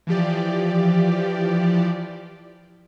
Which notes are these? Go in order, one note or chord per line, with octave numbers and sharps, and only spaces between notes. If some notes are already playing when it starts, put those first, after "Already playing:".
E3 F3 G4 D5